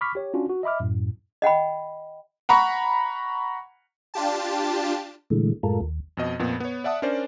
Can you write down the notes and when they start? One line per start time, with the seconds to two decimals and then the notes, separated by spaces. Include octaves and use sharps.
0.01 B5 C#6 D6 F6 B6
0.15 G4 C#5
0.34 C#4 D4 F4 F#4
0.49 F#4
0.63 D#5 E5 B5 D6 F6
0.80 F#2 A2
1.42 D#5 F#5 G5 B5
2.49 F#5 A#5 B5 C#6
4.14 D4 F4 G4 A5
5.30 A#2 D3 E3 G#3 A3
5.63 F#2 A2 G#3 F4 A4 A#4
5.81 D#2
6.17 F2 B2 D#5
6.39 F2 A#2 B3
6.60 B3 C#5
6.84 D5 E5 F#5 A5 D#6
7.02 C#4 D4 A#4 C5 D5